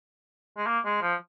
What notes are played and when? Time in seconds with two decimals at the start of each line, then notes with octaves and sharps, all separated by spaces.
0.57 G#3
0.66 A#3
0.85 G#3
1.02 F3